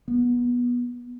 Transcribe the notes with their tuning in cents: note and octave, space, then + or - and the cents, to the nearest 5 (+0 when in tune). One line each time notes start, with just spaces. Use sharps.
B3 -20